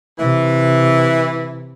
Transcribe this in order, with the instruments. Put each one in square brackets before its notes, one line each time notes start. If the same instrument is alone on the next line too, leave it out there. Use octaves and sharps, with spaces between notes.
[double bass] C3 [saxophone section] E3